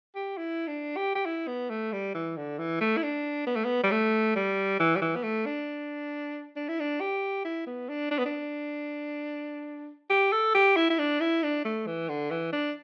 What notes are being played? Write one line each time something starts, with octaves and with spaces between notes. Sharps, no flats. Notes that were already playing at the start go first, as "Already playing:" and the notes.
G4
E4
D4
G4
G4
E4
B3
A3
G3
E3
D3
E3
A3
E4
D4
B3
A3
B3
G3
A3
G3
E3
G3
E3
B3
A3
D4
D4
E4
D4
G4
E4
B3
D4
D4
B3
D4
G4
A4
G4
E4
E4
D4
E4
D4
A3
E3
D3
E3
D4